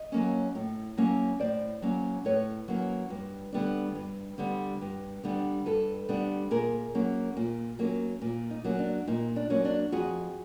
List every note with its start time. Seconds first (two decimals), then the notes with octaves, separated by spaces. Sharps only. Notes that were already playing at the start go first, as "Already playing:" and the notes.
Already playing: D#5
0.12 F#3 A#3 C#4
0.55 A2
0.97 F#3 A#3 C#4
1.40 A2 C5 D5
1.82 F#3 A#3 C#4
2.25 A2 B4 C#5
2.68 F#3 A#3 C#4
3.10 G2
3.52 D3 G3 B3 D4
3.95 G2
4.38 D3 G3 B3 D4
4.81 G2
5.23 D3 G3 B3 D4
5.66 G2 A4 B4
6.09 D3 G3 B3 D4
6.51 A#2 G#4 A#4
6.95 F#3 A#3 C#4
7.37 A#2
7.79 F#3 A#3 C#4
8.22 A#2
8.50 D#4
8.64 F#3 A#3 C#4
8.79 D4
9.07 A#2 D#4
9.36 D4
9.50 F#3 A#3 C#4
9.65 D4
9.92 F2 F#4 G#4